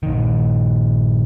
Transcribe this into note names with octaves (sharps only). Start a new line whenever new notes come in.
A#1 D#3